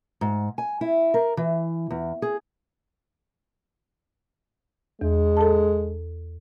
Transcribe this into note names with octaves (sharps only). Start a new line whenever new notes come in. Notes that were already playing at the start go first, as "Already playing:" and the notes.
G#2
G#5
E4
A#4
E3
E2
G#4
E2 G#3
A4 A5